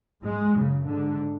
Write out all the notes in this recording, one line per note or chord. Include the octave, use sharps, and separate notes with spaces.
G#2 G#3
F#2 C#3
G#2 D3